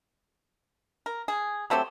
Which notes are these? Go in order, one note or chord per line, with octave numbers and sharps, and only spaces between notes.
A#4
G#4
F#3 A3 C4 G4